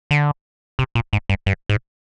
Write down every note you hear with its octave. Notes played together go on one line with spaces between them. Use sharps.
D3
C3
A#2
G#2
G2
G2
G#2